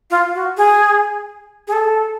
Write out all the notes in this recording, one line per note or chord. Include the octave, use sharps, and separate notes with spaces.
F4
F#4
G#4
G#4
A4